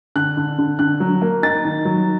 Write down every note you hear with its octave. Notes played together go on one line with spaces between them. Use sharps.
D3 F#6
D3
D3
D3 F#6
F#3
A#3
D#4 A6
D#3
F#3